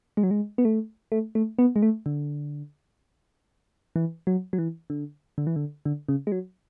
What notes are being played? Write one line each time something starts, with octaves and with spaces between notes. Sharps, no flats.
G#3
F#3
G#3
B3
A3
A3
A3
B3
G#3
A3
D3
E3
F#3
F#3
E3
D3
D3
E3
D3
D3
C#3
G#3
F#3